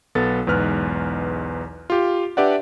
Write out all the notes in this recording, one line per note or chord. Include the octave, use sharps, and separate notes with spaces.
B1 B3 A4 A6
B1 E2 G#2 B4 F6 F#6
F4 G4
D4 G4 B4 D5 E5 F#5